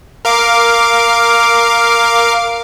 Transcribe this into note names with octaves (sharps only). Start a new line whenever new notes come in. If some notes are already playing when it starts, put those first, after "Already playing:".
A#4 F5 D6